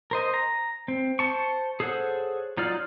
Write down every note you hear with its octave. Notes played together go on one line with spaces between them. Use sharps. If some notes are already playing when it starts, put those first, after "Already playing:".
A#4 C5 D#5
A#5
C4
C5 A5 C#6
G#4 A4 C5 C#5 F#5
F#3 D#4 F4 D5 F6